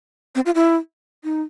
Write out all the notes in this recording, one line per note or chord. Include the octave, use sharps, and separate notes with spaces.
C4
F4
E4
D#4